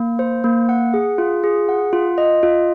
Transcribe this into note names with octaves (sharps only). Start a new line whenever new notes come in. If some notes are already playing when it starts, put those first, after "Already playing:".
Already playing: A#3
C5
A#3
F#5
G#4
F4
G#4
F#5
F4
D#5
F4